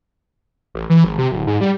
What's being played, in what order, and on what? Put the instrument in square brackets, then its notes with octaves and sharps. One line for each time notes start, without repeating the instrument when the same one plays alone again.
[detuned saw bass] A1
E3
G#1
C3
D1
G#2
G3